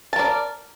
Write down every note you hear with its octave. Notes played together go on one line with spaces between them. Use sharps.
A#4 D5 A5